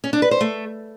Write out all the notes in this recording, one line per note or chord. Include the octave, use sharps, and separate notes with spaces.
C#4
D4
B4
C5
A3